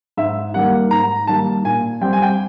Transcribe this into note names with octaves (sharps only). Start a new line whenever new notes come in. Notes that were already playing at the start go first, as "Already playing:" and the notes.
G#2 E5
D#3 G3 A#3 F#5
G#2 A#5
D#3 G3 A#3 A5
A#2 G#5
G3 C4 G5
G#5
G5